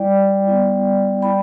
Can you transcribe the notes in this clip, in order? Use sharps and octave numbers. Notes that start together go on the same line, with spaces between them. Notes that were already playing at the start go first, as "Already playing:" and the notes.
Already playing: G3 E4 D5 G5
G3 B3 E4
G3 E4 G5 B5